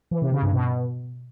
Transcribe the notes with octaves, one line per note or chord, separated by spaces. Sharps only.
E3
C3
C#3
G2
B2